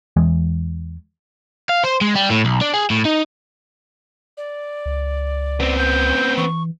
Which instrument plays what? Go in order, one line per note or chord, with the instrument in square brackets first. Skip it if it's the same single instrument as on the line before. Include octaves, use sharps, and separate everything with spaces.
[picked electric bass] E2 E3 G#3
[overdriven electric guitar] F5
C5
G#3
G3
A2
B1
D4
G#4
A2
D#4
[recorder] D5
[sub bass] C#2
[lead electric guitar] B3 C4
[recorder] G6
[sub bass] E3 [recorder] C#6